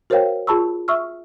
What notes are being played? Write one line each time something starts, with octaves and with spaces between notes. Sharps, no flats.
F#4 A#4 C5 C#5 F5 G5
F4 G#4 A5 B5 C#6 E6
E5 C#6 E6 F6